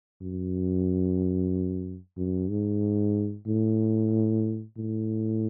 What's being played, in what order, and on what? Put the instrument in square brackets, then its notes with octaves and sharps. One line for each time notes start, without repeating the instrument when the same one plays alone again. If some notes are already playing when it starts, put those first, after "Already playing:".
[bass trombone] F#2
F#2
G#2
A2
A2